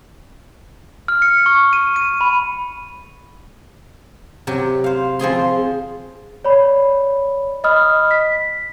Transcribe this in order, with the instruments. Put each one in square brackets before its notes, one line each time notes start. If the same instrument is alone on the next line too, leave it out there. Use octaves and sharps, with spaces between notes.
[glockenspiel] F6
C#7
C#6
D#7
D#7
B5
[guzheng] C3 F#3 G4
C5 F5
F3 C4 G#4 C6
[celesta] C#5 D5 B5
D#5 B5 D#6 F6
B6